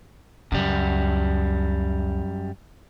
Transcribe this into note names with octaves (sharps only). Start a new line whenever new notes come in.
C#2 F#2 G3